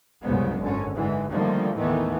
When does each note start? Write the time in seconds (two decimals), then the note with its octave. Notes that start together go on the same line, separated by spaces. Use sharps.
0.22 C2 F#2 C#3 G#3 B3
0.59 G#1 D3 C#4
0.95 G#2 D3 E3 G#3
1.31 D3 D#3 F3 G3 A3 A#3
1.76 D#2 A2 D#3 E3 A3 B3